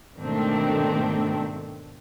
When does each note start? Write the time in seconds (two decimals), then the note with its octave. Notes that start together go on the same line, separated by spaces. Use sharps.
0.19 G#2 B2 D#3 A3 C4 D4